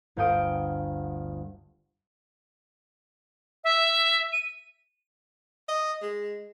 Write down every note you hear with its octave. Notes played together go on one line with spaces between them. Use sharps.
G1 D2 F5 G5 D#6 D7
E5
D#7
D#5
G#3